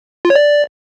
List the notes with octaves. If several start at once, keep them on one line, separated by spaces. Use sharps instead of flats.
F4
C#5
D5